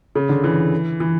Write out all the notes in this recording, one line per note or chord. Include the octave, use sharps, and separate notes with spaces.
C#3
D3
E3
E3